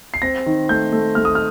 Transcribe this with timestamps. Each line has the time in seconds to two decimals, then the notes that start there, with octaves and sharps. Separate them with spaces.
0.14 C7
0.22 C4 A#6
0.46 D#3
0.69 A3 G6
0.93 A3
1.15 A3 F6
1.25 D#6
1.35 F6